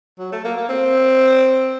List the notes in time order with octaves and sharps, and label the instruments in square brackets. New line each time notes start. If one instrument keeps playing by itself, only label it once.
[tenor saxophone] F#3
A3
A#3
A#3
C4